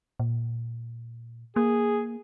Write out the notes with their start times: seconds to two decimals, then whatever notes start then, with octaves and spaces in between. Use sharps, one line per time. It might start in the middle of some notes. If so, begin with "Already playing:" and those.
0.20 A#2
1.56 A#3 G#4